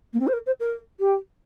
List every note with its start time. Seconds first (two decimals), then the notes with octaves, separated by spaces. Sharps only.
0.13 A#3
0.20 C4
0.27 C5
0.33 A#4
0.46 C5
0.60 A#4
1.00 G4